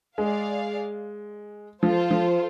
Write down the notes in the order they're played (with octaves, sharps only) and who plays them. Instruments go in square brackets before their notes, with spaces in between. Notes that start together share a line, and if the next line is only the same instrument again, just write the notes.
[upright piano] G#3 [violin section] G#4 D5 F5
[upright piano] F3 [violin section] F4 A4 C5
[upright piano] F3